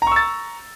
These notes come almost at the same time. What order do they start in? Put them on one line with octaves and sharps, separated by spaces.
A#5 C#6 E6 A6